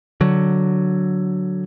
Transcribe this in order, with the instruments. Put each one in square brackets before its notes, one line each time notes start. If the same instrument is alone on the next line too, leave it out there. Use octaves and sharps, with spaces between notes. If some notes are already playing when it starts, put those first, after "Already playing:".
[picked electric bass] D3 F#3